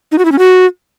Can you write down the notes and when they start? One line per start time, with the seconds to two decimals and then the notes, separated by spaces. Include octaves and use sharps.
0.12 D#4
0.18 F#4
0.25 E4
0.32 C#4
0.39 F#4